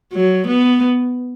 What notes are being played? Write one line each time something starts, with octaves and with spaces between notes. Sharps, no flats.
F#3
B3